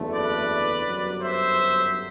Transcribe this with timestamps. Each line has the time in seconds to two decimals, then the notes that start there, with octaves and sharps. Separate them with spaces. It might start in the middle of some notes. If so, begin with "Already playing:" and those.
Already playing: F#1 E2 D3 A3
0.13 B4 D5
0.86 G1 F#2 F#3
1.22 C5 E5